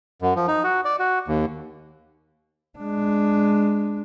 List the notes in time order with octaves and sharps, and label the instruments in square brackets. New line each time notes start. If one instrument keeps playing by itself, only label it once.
[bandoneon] F#2
F3
D#4
F#4
D5
F#4
D#2
[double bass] G#3 D4